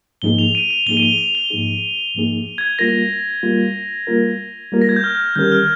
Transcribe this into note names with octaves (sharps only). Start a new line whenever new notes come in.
G#2 F3 A#3 D#4 G#4 G7
F7
D#7
F7
G#2 F3 A#3 D#4 G#4 G7
D#7
F7
F7
G7
G#2 F3 A#3 D#4 G#4
G#2 F3 A#3 D#4 G#4
G#6
G3 A#3 F4 A#4 A#6
G3 A#3 F4 A#4
G3 A#3 F4 A#4
G3 A#3 F4 A#4
A#6
G#6
G6
F6
D#3 G3 C#4 G4 A#4 G6
F6